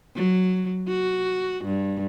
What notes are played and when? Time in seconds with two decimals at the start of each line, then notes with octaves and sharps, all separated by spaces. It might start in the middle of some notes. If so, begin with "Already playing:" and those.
0.16 F#3
0.88 F#4
1.64 G2